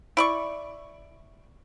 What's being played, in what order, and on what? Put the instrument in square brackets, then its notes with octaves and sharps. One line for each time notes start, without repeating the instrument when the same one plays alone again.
[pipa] E4 D5 C#6